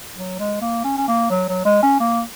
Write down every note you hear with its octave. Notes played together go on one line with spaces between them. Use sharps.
F#3
G#3
A#3
C#4
C#4
A#3
F#3
F#3
G#3
C#4
A#3